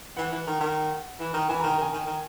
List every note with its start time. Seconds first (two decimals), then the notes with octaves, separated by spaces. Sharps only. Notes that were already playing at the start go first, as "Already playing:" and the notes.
0.17 E3 F#5
0.32 E3
0.47 D#3
0.60 D#3
1.20 E3
1.34 D#3
1.49 E3 G#5
1.60 A#5
1.63 D#3
1.70 A#5
1.78 D#3 G#5
1.93 D#3
2.07 D#3